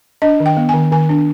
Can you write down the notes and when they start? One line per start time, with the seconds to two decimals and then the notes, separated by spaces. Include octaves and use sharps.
0.22 D4 D#5
0.40 D#3
0.46 G5
0.57 B3
0.69 D#3 G#5
0.92 D#3 G#5
1.09 D4